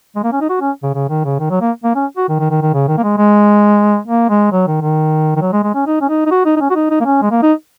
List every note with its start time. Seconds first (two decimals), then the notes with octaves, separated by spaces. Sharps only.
0.16 G#3
0.24 A#3
0.33 C#4
0.41 D#4
0.50 F#4
0.61 C#4
0.83 C#3
0.94 C#3
1.10 D#3
1.25 C#3
1.40 D#3
1.50 F#3
1.61 A#3
1.84 A#3
1.96 C#4
2.17 F#4
2.29 D#3
2.40 D#3
2.51 D#3
2.62 D#3
2.74 C#3
2.89 D#3
2.98 A#3
3.03 G#3
3.18 G#3
4.07 A#3
4.30 G#3
4.52 F#3
4.68 D#3
4.81 D#3
5.36 D#3
5.42 F#3
5.53 G#3
5.64 G#3
5.75 C#4
5.87 D#4
6.01 C#4
6.09 D#4
6.26 D#4
6.31 F#4
6.46 D#4
6.56 D#4
6.61 C#4
6.70 F#4
6.75 D#4
6.91 D#4
7.01 A#3
7.05 C#4
7.22 G#3
7.31 A#3
7.43 D#4